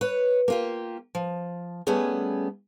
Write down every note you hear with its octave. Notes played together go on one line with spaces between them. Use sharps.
B4 C#5
A#3 F4 G4
F3
G3 A3 B3 C#4 G#4